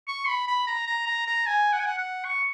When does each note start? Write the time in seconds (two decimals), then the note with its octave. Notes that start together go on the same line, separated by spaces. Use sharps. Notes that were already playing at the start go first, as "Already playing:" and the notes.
0.08 C#6
0.28 B5
0.48 B5
0.67 A#5
0.87 A#5
1.06 A#5
1.27 A#5
1.47 G#5
1.73 F#5
1.80 G#5
1.86 F#5
1.98 F#5
2.25 C#6